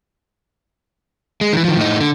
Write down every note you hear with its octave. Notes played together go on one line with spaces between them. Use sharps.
G#3
D#3 E3
D#3 F3
A2 D#4
D3